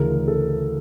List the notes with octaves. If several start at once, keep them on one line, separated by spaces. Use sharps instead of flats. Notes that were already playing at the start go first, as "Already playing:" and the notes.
Already playing: D2 C#3 E3 A#4
A4